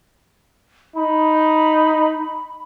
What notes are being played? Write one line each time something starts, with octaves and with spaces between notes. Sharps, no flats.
D#4 B5